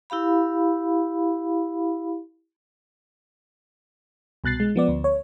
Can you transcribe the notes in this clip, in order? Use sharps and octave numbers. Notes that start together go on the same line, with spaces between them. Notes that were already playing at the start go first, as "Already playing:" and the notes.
E4 G4 F5 B5
C2 B2 F#6 A6 C7
G#3
F3 B3 D5
D2
C#5